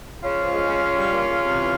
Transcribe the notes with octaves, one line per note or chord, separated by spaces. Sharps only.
C#3 C#4 F4
F3
G#3
C#3
C#3
G3
A#3
C#3
C3
E3